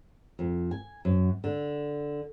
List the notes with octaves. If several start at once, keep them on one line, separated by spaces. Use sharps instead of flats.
F2
G#5
F#2
D3